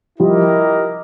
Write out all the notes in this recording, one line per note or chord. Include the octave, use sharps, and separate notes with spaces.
F3 G3 E4 G4 A#4 D#5